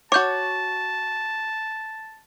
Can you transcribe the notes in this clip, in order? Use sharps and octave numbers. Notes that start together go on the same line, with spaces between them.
F#4 C#5 A5 D6 G6